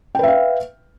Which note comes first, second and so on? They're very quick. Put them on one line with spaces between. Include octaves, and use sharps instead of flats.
G5 B4 E5 F5